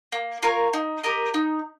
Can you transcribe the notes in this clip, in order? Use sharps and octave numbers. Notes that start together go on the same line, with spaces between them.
A#3
F4 A#4 C#5
D#4
G4 A#4 D#5
D#4